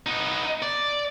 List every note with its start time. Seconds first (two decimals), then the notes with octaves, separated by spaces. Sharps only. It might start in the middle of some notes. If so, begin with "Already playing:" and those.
0.07 B3 D#4
0.62 D5